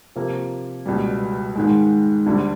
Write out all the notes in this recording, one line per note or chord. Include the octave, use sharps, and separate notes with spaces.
C3 F3 A#3
C#2 B2 G3
G#2 D#3 G#3
D2 D3 G3